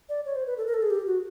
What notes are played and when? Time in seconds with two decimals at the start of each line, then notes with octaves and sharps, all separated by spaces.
0.09 D5
0.26 C#5
0.36 C5
0.47 B4
0.58 A4
0.66 A#4
0.74 A4
0.82 G#4
0.90 G4
1.07 F#4